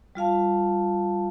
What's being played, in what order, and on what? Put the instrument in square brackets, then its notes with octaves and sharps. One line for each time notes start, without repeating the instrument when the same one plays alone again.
[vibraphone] G3 F4 F5 A5